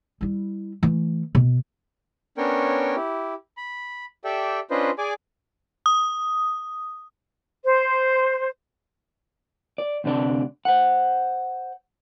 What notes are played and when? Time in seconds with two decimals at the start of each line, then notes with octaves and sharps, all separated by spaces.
0.21 G3 E4
0.83 E3 A3
1.35 B2
2.38 B3 C#4 D4 A#4 C#5 G5
2.96 E4 G4
3.57 B5
4.24 G4 A4 D5 E5 G5
4.71 C#4 D4 F4 B4 C5 D#5
4.98 G#4 D5 G#5 D6
5.86 D#6
7.64 C5
9.78 D5
10.04 D2 C3 D4 D5
10.65 C5 F#5